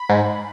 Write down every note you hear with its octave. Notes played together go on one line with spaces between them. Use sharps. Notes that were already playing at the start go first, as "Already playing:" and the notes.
Already playing: B5
G#2